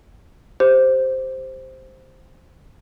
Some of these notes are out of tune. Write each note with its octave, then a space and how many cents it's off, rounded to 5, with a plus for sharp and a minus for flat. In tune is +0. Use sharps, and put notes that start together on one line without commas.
G4 +10 C5 +0